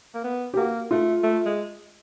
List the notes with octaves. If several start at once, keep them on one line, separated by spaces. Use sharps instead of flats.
A#3
B3
G4
A#3 F#4
A3 F4
A3
G#3